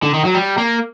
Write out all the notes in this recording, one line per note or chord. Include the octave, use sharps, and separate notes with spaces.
D3
D#3
F#3
G3
A#3